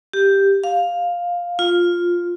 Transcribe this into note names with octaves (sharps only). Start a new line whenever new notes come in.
G4
F5
F4